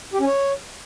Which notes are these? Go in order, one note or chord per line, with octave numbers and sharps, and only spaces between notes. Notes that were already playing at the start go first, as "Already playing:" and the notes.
G4
C#4
C#5